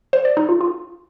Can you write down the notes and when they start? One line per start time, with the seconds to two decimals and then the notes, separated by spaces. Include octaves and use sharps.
0.13 C5
0.25 D5
0.37 D#4
0.49 F4
0.61 F4